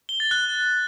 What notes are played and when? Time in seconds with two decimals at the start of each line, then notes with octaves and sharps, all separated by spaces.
0.09 G7
0.20 A6
0.31 F#6